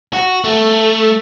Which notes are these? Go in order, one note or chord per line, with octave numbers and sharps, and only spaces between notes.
F#4
A3